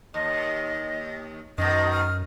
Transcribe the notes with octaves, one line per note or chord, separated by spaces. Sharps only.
D#2 D#5
F#2 B2 D#3 D#5
F6